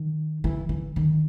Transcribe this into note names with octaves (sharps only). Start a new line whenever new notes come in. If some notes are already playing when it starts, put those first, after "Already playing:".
Already playing: D#3
E3
E3
D#3